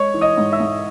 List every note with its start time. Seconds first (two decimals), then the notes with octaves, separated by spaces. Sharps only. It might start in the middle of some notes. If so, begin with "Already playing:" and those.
Already playing: G#3 C#5 C#6
0.14 E3
0.21 D#5 D#6
0.37 G#2
0.52 E5 E6
0.60 G#2